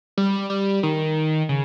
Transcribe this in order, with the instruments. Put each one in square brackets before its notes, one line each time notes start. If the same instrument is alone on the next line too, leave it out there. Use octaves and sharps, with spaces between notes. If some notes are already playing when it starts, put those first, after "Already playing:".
[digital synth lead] G3
G3
D#3
C#3